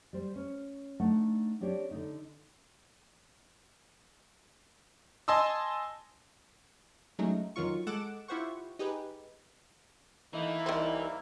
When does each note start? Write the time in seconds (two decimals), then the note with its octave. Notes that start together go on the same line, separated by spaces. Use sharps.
0.13 G3 C5
0.36 C#4
1.00 A3 D4 D#4 F#5
1.61 C4 D4 G4 C#5 D5
1.91 D3 D#4
5.28 D#5 G#5 A5 C6 D#6 E6
7.19 F#3 G#3 A3 C#4 D#4
7.56 F2 D#3 F#3 F4 C#6
7.87 G#3 A4 F#5 D6 D7 E7
8.28 E4 F4 G4 C5 F#5 C#6
8.79 D#4 G4 G#4 B4
10.34 E3 A3 A#3 D#4 E4
10.66 C2 D#3 C5